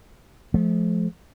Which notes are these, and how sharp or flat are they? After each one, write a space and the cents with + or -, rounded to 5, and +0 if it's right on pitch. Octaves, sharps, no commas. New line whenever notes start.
F3 +0 A3 -40